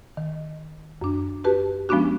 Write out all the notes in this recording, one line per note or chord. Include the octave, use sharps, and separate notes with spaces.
D#3
F#2 D4
F#4 G4 B4 A5
F3 G#3 B3 C#4 D4 F#4